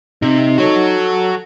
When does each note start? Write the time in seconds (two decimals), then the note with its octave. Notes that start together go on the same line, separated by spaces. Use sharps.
0.22 C3 D#4
0.58 F#4 A4 C#5